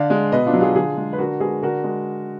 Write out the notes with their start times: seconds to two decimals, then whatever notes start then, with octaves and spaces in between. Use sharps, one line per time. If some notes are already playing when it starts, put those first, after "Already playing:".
Already playing: D3 D5 F5
0.10 G#3
0.32 B2 B4 D#5
0.46 D4 F4
0.53 F#3
0.61 F4 G#4
0.75 D3 F4 G#4
0.97 G#3
1.13 B4
1.18 D3 F#4 A#4
1.40 G#3 G#4 B4
1.63 D3 F#4 A#4
1.84 G#3